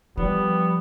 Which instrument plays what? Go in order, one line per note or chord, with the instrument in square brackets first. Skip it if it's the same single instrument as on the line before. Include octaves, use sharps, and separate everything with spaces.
[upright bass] F3 [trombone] G3 [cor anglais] B3